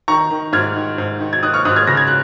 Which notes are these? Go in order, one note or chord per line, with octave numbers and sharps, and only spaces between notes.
D#3 A#5 C#6
D#3
G#2 F6 G#6
D#3
G#2
D#3
G#6
D#3 D#6 F#6
C#6 F6
G#2 D#6 F#6
F6 G#6
C#3 A#6
G#6
F#6